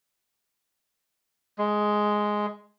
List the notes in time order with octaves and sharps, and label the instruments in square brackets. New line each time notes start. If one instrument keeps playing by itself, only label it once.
[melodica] G#3